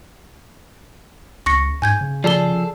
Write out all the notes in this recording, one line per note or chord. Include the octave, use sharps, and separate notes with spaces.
C#2 C#6 A#6 C#7
G#2 G#5 G6 G#6
C#3
F3 G#4 A4 D5 G7